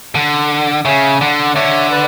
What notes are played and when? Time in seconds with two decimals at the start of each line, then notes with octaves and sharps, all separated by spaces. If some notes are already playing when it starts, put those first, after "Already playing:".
0.15 D3
0.85 C#3 C#5 E5
1.20 D3 D5 F#5
1.55 D3 C#5 E5
1.91 B4 D5